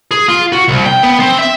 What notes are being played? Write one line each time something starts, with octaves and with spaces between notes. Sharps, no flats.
G#4
F4
F#4
C2
G5
B3
C4
E5